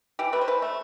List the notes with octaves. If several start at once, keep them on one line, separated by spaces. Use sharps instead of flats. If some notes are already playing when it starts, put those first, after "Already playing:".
E3 G4
A3 B4
C5
E3 B4
A3